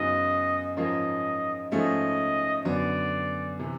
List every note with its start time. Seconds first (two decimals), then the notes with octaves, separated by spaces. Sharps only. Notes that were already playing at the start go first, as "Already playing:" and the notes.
Already playing: F#2 C#3 F#3 B3 D#4 D#5
0.77 G#2 F3 A#3 C#4 F4 D#5
1.71 G#2 F3 A3 C#4 D#5
2.65 F#2 D3 F#3 B3 D5
3.59 C3 E3